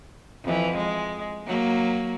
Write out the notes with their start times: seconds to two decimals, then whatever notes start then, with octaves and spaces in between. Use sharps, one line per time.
0.44 F2 E3
0.77 G#3
1.47 F#3 A#3